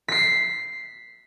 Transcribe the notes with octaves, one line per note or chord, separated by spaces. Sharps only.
B6 C7